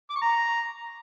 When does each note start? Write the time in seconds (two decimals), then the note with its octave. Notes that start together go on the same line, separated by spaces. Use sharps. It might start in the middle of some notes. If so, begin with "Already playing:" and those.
0.10 D6
0.16 C#6
0.22 A#5